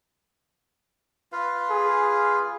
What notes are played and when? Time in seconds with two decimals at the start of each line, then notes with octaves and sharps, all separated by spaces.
1.32 F4 B4 F5
1.71 G#4